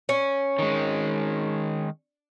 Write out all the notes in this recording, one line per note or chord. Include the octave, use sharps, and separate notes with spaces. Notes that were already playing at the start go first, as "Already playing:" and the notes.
C#4
D#3 G#3